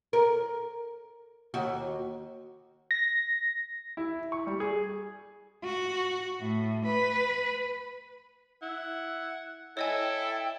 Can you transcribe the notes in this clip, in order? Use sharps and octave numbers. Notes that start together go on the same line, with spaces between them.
A#4
D#2 F#4
A#6
E4
C#6
G3
G#4
F#4
A2
B4
E4 F#5
E4 A4 C#5 D#5 G5 G#5